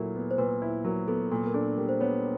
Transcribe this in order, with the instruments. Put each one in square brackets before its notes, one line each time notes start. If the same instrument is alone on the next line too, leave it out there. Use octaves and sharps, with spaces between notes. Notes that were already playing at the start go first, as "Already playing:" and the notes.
Already playing: [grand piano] A#2 F#3 E4 [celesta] A4 A#4
[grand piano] B3
[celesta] C5
[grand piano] A#2 [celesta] B4
[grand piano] E4
[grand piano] F#3 [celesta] A#4
[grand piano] B3 [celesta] A4
[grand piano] A#2 [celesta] A4
[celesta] A#4
[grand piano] D4 [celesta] A4
[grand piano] G3 [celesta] A#4
[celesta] C5
[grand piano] B3 [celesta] C#5